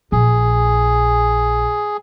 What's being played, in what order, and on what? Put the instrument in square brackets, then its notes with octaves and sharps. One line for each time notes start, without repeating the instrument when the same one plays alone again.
[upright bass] A#1 [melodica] G#4